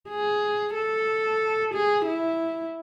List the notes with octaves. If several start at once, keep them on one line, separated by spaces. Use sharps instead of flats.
G#4
A4
G#4
E4